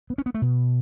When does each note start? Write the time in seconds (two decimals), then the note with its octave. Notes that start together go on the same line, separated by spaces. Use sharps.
0.10 B3
0.18 C#4
0.26 B3
0.34 A3
0.42 B2